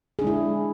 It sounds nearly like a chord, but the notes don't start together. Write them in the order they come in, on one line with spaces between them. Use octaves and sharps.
G#4 D4 G#3 E4